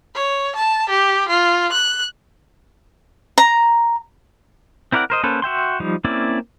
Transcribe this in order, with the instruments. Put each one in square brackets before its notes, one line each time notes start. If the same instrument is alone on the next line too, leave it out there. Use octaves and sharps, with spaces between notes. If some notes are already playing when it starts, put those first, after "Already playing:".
[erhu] C#5
A5
G4
F4
F#6
[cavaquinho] A#5
[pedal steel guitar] C4 E4 A#4 D5 F#5
A#4 C5 D#5
A#3 C#4 A4 B4 C5
F#4 E5 G5 C6
F3 G3 D#4
A#3 C4 C#4 E4 D5